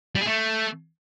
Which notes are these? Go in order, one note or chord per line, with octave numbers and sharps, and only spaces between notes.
G3
G#4
A3